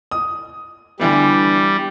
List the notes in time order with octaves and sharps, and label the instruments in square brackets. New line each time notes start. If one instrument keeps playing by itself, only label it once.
[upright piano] D#6
[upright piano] D3 E3 B3 [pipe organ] G3